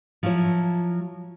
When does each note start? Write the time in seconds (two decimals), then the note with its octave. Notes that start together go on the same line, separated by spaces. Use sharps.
0.23 F3 F#3 E4 C#5